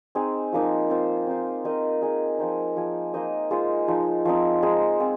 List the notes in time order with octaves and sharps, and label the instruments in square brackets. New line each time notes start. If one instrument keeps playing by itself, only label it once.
[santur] C4 D#4 G#4
F3 A#3 D#4
C4 F4 C5
C4 D#4 C5
C4 D#4 A#4 D#5
D#4 G#4 D#5
F3 C4 D#4
F3 A#3 G#4
A#3 D#4 C5 D#5
G#3 F4 C5
F3 G#3 D#4
F3 C4 D#4
G#3 D#4 G#4 C5
G#3 C4 F4